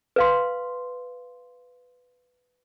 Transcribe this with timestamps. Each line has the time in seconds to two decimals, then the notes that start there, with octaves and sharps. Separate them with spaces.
0.16 B4 F5 C6